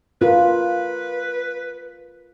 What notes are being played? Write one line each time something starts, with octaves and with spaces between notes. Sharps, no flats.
F4 A#4 B4